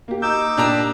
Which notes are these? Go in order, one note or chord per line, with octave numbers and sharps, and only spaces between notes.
A#3 G4
D#4 D6 E6 G6
A#2 D4 G4 A#5